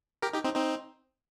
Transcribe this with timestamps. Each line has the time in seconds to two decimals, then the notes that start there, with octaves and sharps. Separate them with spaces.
0.22 G4 A#4
0.33 D#4 G4
0.44 C4 D#4
0.55 C4 D#4